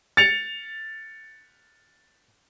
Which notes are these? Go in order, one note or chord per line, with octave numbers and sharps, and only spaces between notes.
A6 C#7 F7